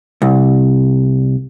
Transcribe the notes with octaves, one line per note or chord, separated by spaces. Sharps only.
C2